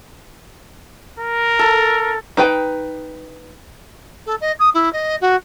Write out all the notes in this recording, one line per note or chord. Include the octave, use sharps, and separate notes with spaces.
A#4
A4
D#4 B4 G5
A4
D#5
D#6
E4
D#5
F#4